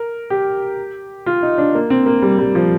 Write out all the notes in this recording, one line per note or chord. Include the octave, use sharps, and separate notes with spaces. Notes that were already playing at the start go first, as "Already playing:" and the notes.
Already playing: A#4
G4
F4
D#4
D4
A#3
C4
A#3
G3
G3
F3